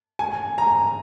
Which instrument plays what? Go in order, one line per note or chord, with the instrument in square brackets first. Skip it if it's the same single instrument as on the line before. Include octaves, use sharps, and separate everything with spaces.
[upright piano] G#5
A#5